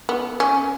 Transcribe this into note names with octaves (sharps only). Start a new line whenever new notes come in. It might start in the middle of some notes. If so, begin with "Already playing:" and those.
B3
C#4